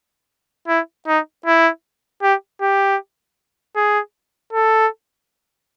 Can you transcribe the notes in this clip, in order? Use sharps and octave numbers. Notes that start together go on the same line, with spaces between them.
E4
D#4
E4
G4
G4
G#4
A4